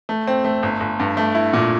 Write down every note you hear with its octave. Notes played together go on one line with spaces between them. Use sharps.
A3
C4
A3
G1
G1
G2
A3
E4
A#2